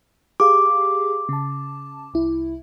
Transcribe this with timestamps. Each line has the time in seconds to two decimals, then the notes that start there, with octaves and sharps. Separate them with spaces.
0.40 G4 G#4 F5 D6
1.29 C#3 A5
2.14 C2 E4